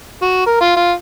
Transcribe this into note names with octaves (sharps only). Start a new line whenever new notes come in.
F#4
A#4
F4
F4